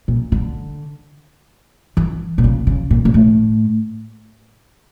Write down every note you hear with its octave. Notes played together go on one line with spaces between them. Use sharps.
A#2
D3
E3
A#2
C#3
C#3
A#2
A#2
A2